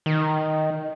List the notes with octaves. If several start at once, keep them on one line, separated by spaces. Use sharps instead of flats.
D#3